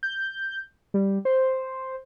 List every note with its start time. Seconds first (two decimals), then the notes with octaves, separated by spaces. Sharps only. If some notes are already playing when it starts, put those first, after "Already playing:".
0.03 G6
0.94 G3
1.25 C5